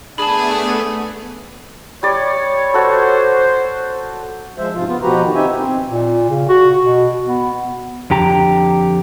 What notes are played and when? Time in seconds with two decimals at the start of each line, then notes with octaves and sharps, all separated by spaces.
0.18 A3 B3 D4 G#4 A5 B5
2.03 G3 C#5 D5
2.74 F#4 A4 C5
4.58 F3 G#3 C5 E5
4.75 G#2 C3 F3 F4
4.88 B3 F4
5.03 B2 F3 F#4 G4 B4 A#5
5.23 D#3
5.35 C4 D#4 G4 E5 G#5
5.57 C4
5.90 A#2
6.30 C#3
6.49 F#4
6.82 B2
7.26 B3
8.10 F2 D3 G4 A#5